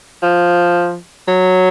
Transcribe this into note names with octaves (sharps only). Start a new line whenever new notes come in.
F3
F#3